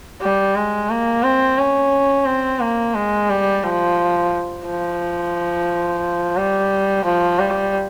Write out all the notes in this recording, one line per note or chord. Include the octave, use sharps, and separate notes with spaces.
G3
G#3
A#3
C4
C#4
C4
A#3
G#3
G3
F3
F3
G3
F3
G3